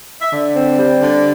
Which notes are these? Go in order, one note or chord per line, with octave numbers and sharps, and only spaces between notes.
E5
D3 D5
C4
G3
D3